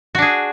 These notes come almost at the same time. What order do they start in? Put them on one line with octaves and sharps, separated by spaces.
F#4 D4 G#4